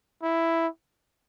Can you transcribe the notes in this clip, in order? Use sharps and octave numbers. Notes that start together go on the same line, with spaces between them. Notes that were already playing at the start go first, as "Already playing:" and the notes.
E4